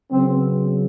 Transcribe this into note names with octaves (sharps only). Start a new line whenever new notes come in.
C#3 F#3 B3 C4